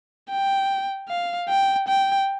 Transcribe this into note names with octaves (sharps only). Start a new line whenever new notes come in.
G5
F5
G5
G5